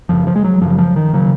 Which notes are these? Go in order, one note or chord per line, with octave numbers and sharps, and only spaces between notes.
F#2 C#3 F3
F3
G#3
F#3
F#2 C#3 F3
F3
D#3
C#3 F#3